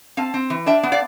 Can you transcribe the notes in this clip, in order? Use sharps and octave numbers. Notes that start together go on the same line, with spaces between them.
C4 F5 A5
C4
E3
D4 E5 G5
B3
D5 F5